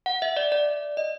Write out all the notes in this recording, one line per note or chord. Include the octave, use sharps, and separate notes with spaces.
F#5
E5
D5
D5
D#5